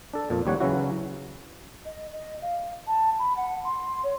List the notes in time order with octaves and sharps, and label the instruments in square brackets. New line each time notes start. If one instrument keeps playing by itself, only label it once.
[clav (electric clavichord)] D4 A4
F2 A#2
D#2 G3 C#5 F#5
C#3 E3 F#3 C#4 E4 F#4
[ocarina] D#5
D#5
F5
A5
B5
F#5
C6
C#5